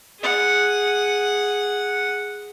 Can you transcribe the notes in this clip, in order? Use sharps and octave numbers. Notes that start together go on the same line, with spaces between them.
G#4 F#5